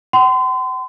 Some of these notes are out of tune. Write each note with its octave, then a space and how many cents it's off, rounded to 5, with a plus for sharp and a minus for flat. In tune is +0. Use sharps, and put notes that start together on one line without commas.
F#5 +45 C6 -35